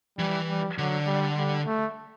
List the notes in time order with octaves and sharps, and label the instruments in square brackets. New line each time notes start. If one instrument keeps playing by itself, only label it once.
[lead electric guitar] E3 [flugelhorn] G3
[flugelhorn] G3
[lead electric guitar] D3 [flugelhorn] F#3
[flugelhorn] G3
G3
A3